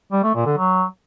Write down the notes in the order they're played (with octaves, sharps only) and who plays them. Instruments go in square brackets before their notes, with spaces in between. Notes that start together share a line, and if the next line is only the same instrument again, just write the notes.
[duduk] G3
A3
A#2
D3
F#3